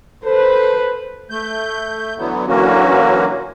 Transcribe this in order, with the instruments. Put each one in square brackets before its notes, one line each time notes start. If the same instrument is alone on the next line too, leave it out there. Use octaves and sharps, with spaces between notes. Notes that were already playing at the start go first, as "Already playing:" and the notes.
[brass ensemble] A4 B4 [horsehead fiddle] C5
[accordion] A3 G6
D3 E3 F#3 B3
D3 E3 F#3 A#3 C#4 F#4